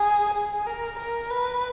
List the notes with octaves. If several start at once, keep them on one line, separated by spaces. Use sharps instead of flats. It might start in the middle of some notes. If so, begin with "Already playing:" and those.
Already playing: G#4
G#4
A#4
A#4
B4